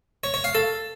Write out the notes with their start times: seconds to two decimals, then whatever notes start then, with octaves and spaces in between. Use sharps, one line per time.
0.24 C#5
0.34 C#5
0.44 F5
0.55 A4